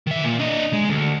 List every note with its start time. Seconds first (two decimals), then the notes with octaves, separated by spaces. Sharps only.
0.07 D#3 E5
0.24 A#2
0.39 D4 D#5
0.73 G#3
0.89 D2